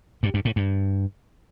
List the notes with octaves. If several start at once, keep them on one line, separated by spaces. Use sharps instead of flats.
G2
G2
A2
G2